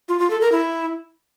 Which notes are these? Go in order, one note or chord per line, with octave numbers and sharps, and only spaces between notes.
F4
F4
A4
A#4
E4